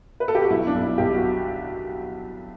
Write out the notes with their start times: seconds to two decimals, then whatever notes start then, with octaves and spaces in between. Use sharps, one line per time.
0.20 B4
0.28 A4
0.35 G4
0.42 F#4
0.50 B1 E4
0.67 D4
0.74 B1
0.82 E4
0.98 B1 G4
1.15 F#4